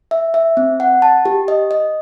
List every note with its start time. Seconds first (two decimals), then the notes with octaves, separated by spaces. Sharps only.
0.11 E5
0.34 E5
0.57 C4
0.80 F#5
1.02 A5
1.25 G4
1.48 D#5
1.71 D#5